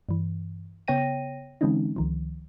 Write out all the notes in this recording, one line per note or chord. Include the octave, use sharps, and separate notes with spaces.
G2 E3
C#3 B3 C#5 G5 A#6 D#7
D3 E3 G#3 C4 C#4 D#4
C#2 D#3 F3